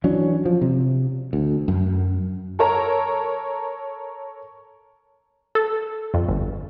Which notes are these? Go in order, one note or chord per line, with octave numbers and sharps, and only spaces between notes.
E3 F#3 C#4 D4
F3
C3
D2
F#2
A4 A#4 C#5 A#5
A4
F2
G1